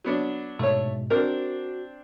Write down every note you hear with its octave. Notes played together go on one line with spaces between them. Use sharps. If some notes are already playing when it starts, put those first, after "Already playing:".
F#3 B3 D4
G#2 B2 G#3 A3 C#5
C4 D4 F#4 A#4